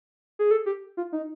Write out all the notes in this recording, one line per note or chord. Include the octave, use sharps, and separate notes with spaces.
G#4
A4
G4
F4
D#4